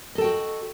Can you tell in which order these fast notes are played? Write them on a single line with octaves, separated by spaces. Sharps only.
D#5 A4 G5 F#4